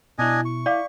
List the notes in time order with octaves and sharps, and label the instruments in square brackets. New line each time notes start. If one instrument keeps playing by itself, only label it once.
[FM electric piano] B2 E4 [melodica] D4 D#5 G#5
[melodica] C#6
[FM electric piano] E4 [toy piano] D5 F5 D6